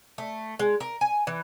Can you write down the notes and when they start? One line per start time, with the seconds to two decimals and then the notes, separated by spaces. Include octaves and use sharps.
0.18 A3
0.59 G#3
0.80 A#4
1.01 G#5
1.27 E3